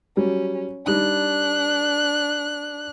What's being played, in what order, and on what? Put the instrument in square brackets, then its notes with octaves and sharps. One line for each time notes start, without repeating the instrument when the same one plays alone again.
[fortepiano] F#3 G3 [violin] C#4
[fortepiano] G3 D#4 [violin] D4 F#6